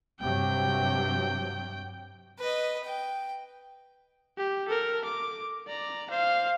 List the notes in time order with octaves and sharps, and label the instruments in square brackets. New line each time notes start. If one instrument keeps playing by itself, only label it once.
[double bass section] G2 C3 F#3 [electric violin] G5
[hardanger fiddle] B4 D#5
G5
[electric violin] G4
A4 A#4
D6
D5 A#5
C5 F5